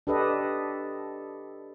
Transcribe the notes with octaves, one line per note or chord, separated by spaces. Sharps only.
D4 G4 A4 B4 D#5